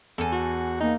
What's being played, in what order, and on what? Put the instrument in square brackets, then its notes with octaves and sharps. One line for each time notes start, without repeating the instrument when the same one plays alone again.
[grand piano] E2 [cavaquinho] A4 G#5
[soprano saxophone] F#4
[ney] A#3 [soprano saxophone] D#4